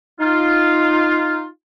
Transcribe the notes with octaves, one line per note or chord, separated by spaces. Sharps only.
D#4 F4